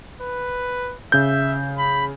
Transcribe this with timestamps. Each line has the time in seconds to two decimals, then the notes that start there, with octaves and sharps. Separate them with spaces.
0.21 B4
1.12 C#3 E5 G6
1.78 B5